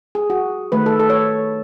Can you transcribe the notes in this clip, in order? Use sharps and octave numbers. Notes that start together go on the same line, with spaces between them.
G#4
F#4
D#3 A3 B4
A4
A4
C#5